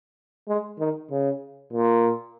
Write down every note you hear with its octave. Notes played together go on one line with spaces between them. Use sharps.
G#3
D#3
C#3
A#2